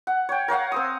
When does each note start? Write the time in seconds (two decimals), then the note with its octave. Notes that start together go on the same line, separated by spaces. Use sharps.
0.07 F#5
0.29 C#5 G5
0.48 A#4 C#5 F5 F#5
0.72 C4 C5 D#6